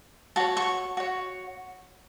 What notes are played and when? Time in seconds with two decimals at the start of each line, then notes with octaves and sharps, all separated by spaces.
0.36 F#4 C#5 A5
0.57 C#6
0.97 F#4 C#5